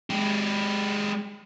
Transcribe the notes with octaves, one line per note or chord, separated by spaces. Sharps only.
G#3 G4